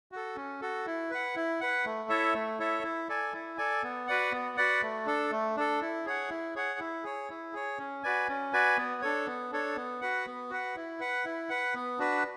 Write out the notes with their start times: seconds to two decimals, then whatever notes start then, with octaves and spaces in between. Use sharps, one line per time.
0.12 F#4 A4
0.36 C#4
0.61 F#4 A4
0.86 E4
1.10 B4 F#5
1.36 E4
1.61 B4 F#5
1.85 A3
2.09 E4 A4 C#5 E5
2.34 A3
2.59 E4 A4 C#5 E5
2.83 E4
3.09 A4 D5 G#5
3.33 E4
3.58 A4 D5 G#5
3.83 B3
4.07 F#4 B4 D5 F#5
4.32 B3
4.57 F#4 B4 D5 F#5
4.82 A3
5.06 D4 A4
5.31 A3
5.57 D4 A4
5.81 E4
6.05 G#4 C#5 F#5
6.30 E4
6.55 G#4 C#5 F#5
6.79 E4
7.04 G#4 C#5
7.30 E4
7.53 G#4 C#5
7.78 C#4
8.03 F#4 B4 D5 G#5
8.28 C#4
8.53 F#4 B4 D5 G#5
8.77 B3
9.02 D4 A4 C#5
9.26 B3
9.52 D4 A4 C#5
9.76 B3
10.01 F#4 B4 F#5
10.26 B3
10.50 F#4 B4 F#5
10.76 E4
11.00 B4 F#5
11.25 E4
11.49 B4 F#5
11.74 B3
11.99 D4 F#4 B4